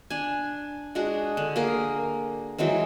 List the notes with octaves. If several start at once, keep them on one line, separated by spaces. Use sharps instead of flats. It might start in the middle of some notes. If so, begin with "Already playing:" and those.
D4 G#5
G#3 D4 F#4 G#4
D3
A#3 G#4 A#4
E3 F#3 G#3 C4